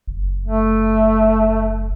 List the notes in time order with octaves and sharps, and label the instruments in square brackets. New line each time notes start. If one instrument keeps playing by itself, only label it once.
[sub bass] F#1
[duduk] A3